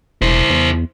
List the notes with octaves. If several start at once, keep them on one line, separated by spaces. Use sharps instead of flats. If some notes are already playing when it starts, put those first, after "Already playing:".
E1 E4 C5
E2